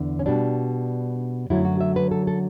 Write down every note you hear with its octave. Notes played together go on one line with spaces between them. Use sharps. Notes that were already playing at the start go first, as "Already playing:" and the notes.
Already playing: E2 D3
C#4
B2 G3 D4
F#2 D3 F#3 A3 E4
F#4
E5
B4
A4
A4